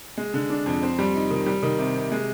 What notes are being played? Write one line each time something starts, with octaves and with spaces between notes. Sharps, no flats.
G#3
D3
D4
F2
C4
G3
D#4
D#3
G3
D#3
C3
C3
G#3